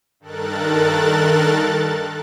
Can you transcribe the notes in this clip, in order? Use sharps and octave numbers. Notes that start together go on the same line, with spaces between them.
G2 D#3 A4 A#4 F#6 A6